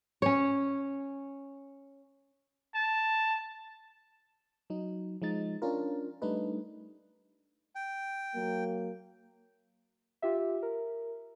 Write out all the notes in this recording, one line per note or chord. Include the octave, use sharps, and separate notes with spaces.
C#4 C#5
A5
F#3 D#4
F3 G#3 D#4 A6
C#4 D4 F4 A#4
G3 A3 D4 D#4 B4
G5
F#3 A#3
F4 G4 E5
A#4